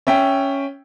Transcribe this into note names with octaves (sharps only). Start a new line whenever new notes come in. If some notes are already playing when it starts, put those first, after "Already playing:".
C#4 E5 G5